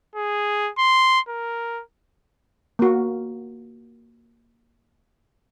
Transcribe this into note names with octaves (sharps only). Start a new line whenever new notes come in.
G#4
C6
A#4
A#3 F#4